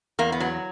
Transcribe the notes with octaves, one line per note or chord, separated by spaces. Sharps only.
E2 A#3
B3
F#3